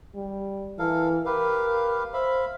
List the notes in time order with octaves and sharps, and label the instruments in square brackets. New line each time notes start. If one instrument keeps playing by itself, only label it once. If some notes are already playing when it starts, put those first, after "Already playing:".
[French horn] G3
[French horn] E3 [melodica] A4 A#4 F5
[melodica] G4 B4 F5 [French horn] A#4
[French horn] C5 [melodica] E5 F5 B5